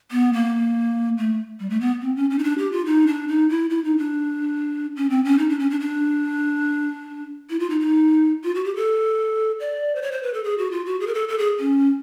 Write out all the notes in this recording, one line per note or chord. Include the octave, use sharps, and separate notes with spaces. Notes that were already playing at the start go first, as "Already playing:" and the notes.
B3
A#3
A3
G3
A3
B3
C4
C#4
C#4
D#4
D4
G4
F4
D#4
D4
D#4
E4
E4
D#4
D4
C#4
C4
C#4
D#4
D4
C#4
D4
D4
E4
F4
D#4
D#4
F4
F#4
G4
A4
D5
C5
C#5
C5
B4
A4
G#4
F#4
F4
F#4
G#4
A#4
A4
A4
G#4
C#4